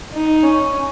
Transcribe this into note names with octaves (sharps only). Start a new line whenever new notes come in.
D#4
C#4